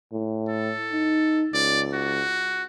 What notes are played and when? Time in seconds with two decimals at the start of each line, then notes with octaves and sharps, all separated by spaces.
0.12 A2
0.49 A4
0.92 D#4
1.54 C#2 D5
1.93 F#4